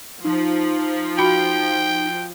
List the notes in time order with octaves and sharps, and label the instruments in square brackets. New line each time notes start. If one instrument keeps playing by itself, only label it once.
[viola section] F3 [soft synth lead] D#4
[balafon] F#4 B5 [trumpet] G5